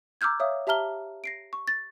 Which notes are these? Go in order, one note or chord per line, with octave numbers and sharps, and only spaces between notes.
A#5 D6 E6 F6 G6 G#6
C#5 E5 F5 D#6
G4 E5 A5 A#5 F6 G7
A#6 C7 D7
C#6
A6